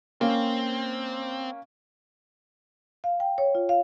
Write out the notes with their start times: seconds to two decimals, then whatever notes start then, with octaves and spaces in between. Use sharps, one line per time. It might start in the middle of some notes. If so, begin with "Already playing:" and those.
0.21 A#3 C4 C#4
3.04 F5
3.20 G5
3.38 C#5
3.55 F4
3.69 F5